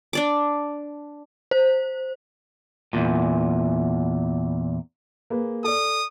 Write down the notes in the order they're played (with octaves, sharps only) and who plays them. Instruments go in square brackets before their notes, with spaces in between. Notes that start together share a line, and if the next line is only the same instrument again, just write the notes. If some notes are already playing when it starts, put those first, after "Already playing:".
[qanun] D4 D5 D6
[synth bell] C5
[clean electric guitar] E2 A#2
[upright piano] A#3 G#4 B4
[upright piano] A4 D5 [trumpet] D#6